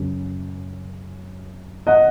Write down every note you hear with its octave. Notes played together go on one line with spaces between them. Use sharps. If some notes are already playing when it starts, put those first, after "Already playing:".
Already playing: F#2 C#3
D#5 F#5